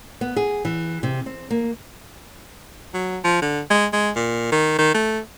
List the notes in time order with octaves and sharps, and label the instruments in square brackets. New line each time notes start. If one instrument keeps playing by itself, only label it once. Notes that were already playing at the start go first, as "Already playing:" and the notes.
[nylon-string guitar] B3
G#4
E3
C3
C4
A#3
[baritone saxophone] F#3
F3
D3
G#3
G#3
A#2
D#3
D#3
A3